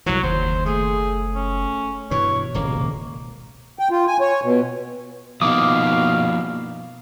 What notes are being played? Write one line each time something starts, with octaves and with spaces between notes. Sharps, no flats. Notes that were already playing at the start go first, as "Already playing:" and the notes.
C2 E3 F#3
F#1 D#2 C5
A3 G#4
C#4
G2 B2 E3 C#5
D#1 G#1 C#2 A#3
G5
F4
G#5
C#5
B2
B2 F3 A#3 D#4 F5 D6 D#6